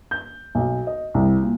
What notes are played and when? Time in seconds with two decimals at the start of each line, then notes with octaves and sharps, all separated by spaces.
0.11 G6
0.55 B1
0.87 D#5
1.14 C2
1.42 A#2